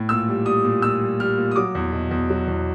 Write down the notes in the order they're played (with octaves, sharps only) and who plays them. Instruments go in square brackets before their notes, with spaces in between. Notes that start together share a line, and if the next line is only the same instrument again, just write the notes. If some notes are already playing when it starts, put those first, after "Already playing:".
Already playing: [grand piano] A2
A#2 E6
G3
G3 D#6
A#2
A#2 E6
G3
G3 F6
A#2
D#6
F#3 D6
E2
B2
E2
F#3
E2